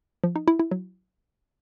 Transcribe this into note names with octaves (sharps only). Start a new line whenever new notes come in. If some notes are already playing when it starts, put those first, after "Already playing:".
F3
D#4
E4
E4
F#3